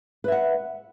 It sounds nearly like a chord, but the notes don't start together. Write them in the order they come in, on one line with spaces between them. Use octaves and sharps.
B4 E5 F#5